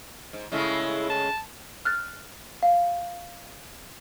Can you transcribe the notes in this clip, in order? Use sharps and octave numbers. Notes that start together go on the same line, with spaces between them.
G#2
C#3 G#3 A3 E4
A5
F6 F#6 A6
F5